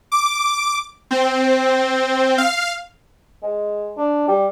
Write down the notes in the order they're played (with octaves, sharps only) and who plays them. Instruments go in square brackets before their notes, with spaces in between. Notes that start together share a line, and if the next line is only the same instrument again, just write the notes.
[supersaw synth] D6
C4
F5
[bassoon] G#3
D4
G3